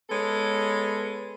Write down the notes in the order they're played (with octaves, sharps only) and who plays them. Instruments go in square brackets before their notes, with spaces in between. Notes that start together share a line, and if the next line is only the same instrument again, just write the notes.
[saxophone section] G#3 B3 A4 C#5